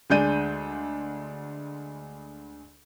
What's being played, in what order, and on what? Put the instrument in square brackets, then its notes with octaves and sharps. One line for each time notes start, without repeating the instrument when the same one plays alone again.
[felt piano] D2 G#3 D4 G6 D#7